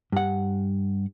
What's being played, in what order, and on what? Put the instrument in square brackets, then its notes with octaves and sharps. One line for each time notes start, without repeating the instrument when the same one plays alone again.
[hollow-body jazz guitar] G2 F#5